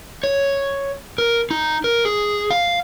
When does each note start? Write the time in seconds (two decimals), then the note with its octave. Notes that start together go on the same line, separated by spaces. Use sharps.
0.24 C#5
1.18 A#4
1.51 D#4
1.84 A#4
2.05 G#4
2.50 F5